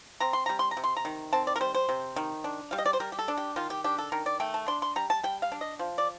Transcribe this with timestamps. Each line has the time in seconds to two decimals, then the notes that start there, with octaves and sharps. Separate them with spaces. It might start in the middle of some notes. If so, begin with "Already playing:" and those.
0.20 C4 A#5
0.33 C6
0.46 G3 A#5
0.59 C6
0.71 A#5
0.77 C3
0.84 C6
0.97 A#5
1.05 D#3
1.33 C4 A5
1.47 D5
1.56 A#4
1.61 G3 C5
1.75 C5
1.89 C3
2.16 D#3
2.44 D4
2.71 G3 F5
2.78 D#5
2.86 D5
2.93 C5
3.00 G3 A#4
3.12 G4
3.19 A4
3.28 D4
3.37 G4
3.56 D#3 F4
3.70 G4
3.84 D4 G4
3.98 A4
4.12 D#3 A#4
4.26 D5
4.40 A3 G5
4.54 A5
4.68 D4 C6
4.82 C6
4.96 G3 A#5
5.10 A5
5.23 G3 G5
5.42 F5
5.52 D4
5.61 D#5
5.79 F3
5.98 D5